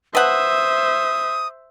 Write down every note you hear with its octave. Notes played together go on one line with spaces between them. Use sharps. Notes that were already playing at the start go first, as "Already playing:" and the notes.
B4 C5 E5 F#5 D#6